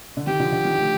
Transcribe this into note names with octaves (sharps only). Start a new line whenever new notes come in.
D3
D#3 G4
D3 F3
D3
D#3
F3 A3